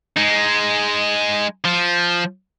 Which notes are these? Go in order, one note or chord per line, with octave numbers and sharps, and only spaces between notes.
G#3 D#4
F3